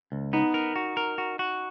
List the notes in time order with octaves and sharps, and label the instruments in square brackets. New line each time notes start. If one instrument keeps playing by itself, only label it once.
[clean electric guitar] C#2
[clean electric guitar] B3 [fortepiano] D#4
[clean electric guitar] A#4
F#4
A#4
F#4
F#4